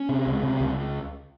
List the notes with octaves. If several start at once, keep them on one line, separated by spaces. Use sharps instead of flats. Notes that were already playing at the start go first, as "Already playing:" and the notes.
Already playing: C#4
C3
C#2
C3
C#2